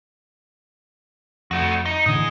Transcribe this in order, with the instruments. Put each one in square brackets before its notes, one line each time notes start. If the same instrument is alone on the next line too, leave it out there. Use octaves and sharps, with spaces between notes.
[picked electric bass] F2 [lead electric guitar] A3 F#4
[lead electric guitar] D#4
[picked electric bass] A2 D3 E3 [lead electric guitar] G#4 D#5